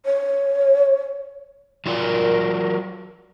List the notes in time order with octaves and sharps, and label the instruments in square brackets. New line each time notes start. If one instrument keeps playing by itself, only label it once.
[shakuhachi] C#5
[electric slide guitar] F#3 F4 D5 [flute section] A#4